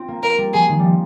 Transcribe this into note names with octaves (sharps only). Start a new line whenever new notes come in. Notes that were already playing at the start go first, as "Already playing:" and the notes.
Already playing: C4 F4
A#3
A#3 A#4
G3
F3 G#4
D#3
G3
F3